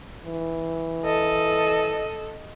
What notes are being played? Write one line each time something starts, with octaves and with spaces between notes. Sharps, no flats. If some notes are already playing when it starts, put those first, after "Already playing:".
E3
A4 D#5